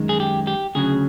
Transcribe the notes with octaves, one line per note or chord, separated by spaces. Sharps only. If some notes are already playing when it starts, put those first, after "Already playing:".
Already playing: F#2 D#3 G#3
G#4
G4
G4
D2 C#3 F#3 G#4